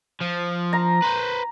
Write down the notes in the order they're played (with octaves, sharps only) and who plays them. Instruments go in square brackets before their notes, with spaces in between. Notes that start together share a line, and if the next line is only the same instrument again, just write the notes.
[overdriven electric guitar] F3
[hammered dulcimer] A#5
[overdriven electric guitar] B4 C5